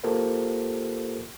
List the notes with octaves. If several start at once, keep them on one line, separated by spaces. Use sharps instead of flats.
A#3 F4 G4 A4 A#4 C5